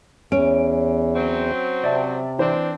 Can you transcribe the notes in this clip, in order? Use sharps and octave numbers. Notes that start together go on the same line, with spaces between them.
E2 C#4 D7
F#3 C4
C3 D5 E5 A5
E3 C4 D4 C5